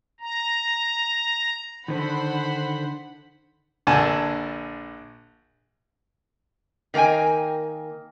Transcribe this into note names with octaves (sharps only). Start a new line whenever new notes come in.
A#5
D3 D#3 C5 F#5 B5
A#1 D3 D4 G#5 A5
D#3 A#3 A#4 G5 G#5